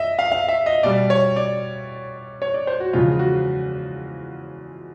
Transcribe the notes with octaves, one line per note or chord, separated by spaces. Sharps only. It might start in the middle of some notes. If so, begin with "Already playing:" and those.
Already playing: D#5 E5
F5
F5
E5
D#5
B2 G3 D5
C#5
D5
C#5
D5
C5
F#4
E2 C#3 F3 G#3 F4
F#4